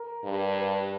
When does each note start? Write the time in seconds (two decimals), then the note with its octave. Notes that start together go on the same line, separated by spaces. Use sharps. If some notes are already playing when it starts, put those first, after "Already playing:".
Already playing: A#4
0.24 G2
0.58 B4